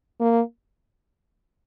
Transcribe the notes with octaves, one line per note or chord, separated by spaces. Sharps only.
A#3